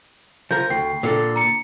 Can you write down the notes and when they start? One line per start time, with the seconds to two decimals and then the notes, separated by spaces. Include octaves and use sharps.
0.51 F3 A#4 G6
0.70 D2 G5 C7
1.03 A#2 D3 A4
1.36 A#5 C#7